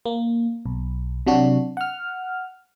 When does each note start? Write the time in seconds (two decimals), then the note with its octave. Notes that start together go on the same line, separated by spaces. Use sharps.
0.06 A#3
0.66 B1
1.27 C3 F#3 D4 F#4
1.77 F#5 F6